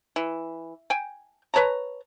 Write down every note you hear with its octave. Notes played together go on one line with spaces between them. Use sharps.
E3
G5 G#5
B4 C#5 A5 A#5